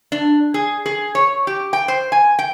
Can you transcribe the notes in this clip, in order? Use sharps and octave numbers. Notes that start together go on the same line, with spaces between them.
D4
G#4
G#4
C#5
G4
G5
C5
G#5
G5